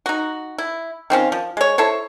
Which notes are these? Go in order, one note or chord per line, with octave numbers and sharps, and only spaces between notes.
D#4 F#4
E4
D#3 C4 C#4 F4
F3
G#3 C#5
E4 A4 C5 C#5